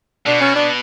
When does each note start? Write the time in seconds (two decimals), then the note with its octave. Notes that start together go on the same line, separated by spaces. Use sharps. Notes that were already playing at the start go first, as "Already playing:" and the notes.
0.26 B2 D4
0.41 C#4
0.55 D4